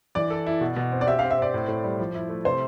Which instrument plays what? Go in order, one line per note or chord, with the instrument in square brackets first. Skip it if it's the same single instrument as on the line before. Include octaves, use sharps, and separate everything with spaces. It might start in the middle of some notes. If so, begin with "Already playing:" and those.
[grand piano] E3 [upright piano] D5
[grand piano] A4
E4
B2
B2
C4
[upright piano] D5
[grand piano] G4 [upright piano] E5
[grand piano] C4 [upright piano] F5
[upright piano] E5
[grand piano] C4 [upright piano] D5
[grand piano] A2
A2
G3
F3
E4
A3
[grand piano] C3 [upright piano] C5